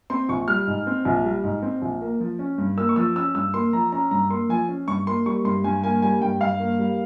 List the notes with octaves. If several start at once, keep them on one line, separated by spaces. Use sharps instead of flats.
C4 C6
A#1 C#6
G3 F6
G#2
C4
A#1
G3
G#2
C4
A#1
A#3
F3
C#4
G2
A#3 E6
C#6
F3 E6
C#4 E6
G2 E6
A#3 C6
F3 A#5
C#4 A#5
G2 A#5
A#3 C6
F3 G#5
C#4
G2 C#6
A#3 C6
G3 C#6
G2 C6
G2 G#5
A#3 G#5
G3 G#5
G2 G5
G2 F5
A#3
G3